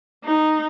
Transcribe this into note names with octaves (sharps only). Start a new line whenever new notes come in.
D#4